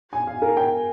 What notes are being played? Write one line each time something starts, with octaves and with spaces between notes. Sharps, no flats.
G#5
F5
A#4
G5